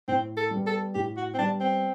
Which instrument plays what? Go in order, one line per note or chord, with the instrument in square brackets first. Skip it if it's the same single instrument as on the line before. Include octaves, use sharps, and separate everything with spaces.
[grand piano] A2 [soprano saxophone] C4
[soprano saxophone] A4
[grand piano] G3
B3
[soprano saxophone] A4
[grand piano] A2 [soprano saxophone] G4
[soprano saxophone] F#4
C4
[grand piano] G3 B3 [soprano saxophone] D4
[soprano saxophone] C4